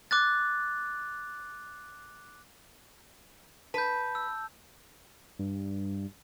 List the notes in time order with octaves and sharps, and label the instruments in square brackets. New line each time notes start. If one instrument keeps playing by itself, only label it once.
[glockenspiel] D6 F#6 A6
[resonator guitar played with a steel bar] B4 [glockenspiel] A5 G6
[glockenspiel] E6
[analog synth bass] G2